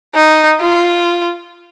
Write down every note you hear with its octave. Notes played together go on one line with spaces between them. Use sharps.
D#4
F4